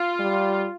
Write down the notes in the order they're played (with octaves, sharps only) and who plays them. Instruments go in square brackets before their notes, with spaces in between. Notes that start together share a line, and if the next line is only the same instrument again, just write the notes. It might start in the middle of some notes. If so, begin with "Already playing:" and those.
Already playing: [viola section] F4
[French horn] G3